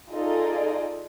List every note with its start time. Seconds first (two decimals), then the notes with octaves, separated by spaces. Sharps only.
0.10 D#4 F4 G#4 A4 D5 D#5